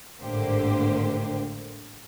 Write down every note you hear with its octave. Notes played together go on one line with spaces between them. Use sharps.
G#1 A2 D3 A#3 G4 C5